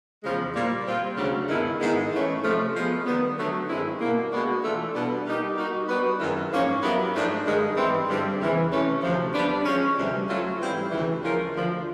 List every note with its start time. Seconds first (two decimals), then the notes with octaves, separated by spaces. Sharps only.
0.24 E2 C#3 F3 G#3
0.55 A#2 G3 A#3
0.86 G3 C4 F4
1.17 D2 C#3 F#3 A3 D4
1.49 G2 D#3 G#3 B3 E4
1.80 G#2 D#3 G#3 B3 E4
2.12 E3 A3 C#4
2.43 C3 F3 A3
2.74 F3 G#3 B3
3.06 D#3 G3 B3
3.37 D3 F#3 A3
3.69 G2 D#3 G#3 C4 E4
4.00 B2 G3 A#3
4.32 B2 G#3 B3 D4 F#4
4.63 E3 A3 D4 F4 A4
4.94 B2 G3 B3 D4
5.26 G3 A#3 D#4 G4
5.57 G3 A#3 D#4 F#4
5.88 G3 B3 D4 F#4 B4
6.20 F#2 D#3 G#3 C4 E4
6.52 G#2 F3 A#3 C#4
6.83 F#3 B3 E4 G4 A#4
7.14 G#2 F3 A3 D4
7.46 G2 D#3 G#3
7.77 G#2 E3 G3 C4
8.08 G2 D3 G3 C4
8.40 E2 C#3 E3
8.72 C3 E3 A3 C#4
9.02 D2 C3 F3
9.34 G3 B3 D4
9.66 F3 G#3 C#4
9.97 D2 C3 E3 G3
10.28 F#3 A3 C#4 F4
10.59 G#2 E3 G3 C4 E4
10.91 D2 C#3 E3
11.23 F3 G#3 C#4 F4 A#4
11.54 D2 D3 F3